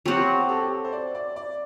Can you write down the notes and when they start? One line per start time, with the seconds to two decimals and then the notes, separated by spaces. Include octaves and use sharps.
0.06 F#3 C4 F#4 G4
0.38 G4
0.49 A4
0.59 G4
0.71 A4
0.85 C5
0.92 D5
1.15 D5
1.36 D5